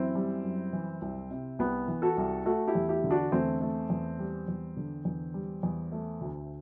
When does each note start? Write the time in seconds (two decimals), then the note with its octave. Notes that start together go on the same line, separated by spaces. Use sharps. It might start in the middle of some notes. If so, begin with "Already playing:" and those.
Already playing: F#2 E3 C4 E4
0.15 G3
0.44 F#2
0.73 E3
1.02 C2
1.31 C3
1.59 C2 B3
1.88 E3
2.02 F#4 A4
2.17 C2
2.46 A3 F#4 A4
2.67 E4 G4
2.75 E2
2.89 E4 G4
3.04 D3
3.11 D4 F#4
3.32 E2 A3 C4
3.61 A3
3.90 E2
4.19 G3
4.48 E2
4.77 D3
5.05 E2
5.34 G3
5.63 E2
5.92 A3
6.21 D2